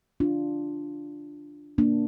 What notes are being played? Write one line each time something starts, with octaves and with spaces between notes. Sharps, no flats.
D4 F4
A#3 D4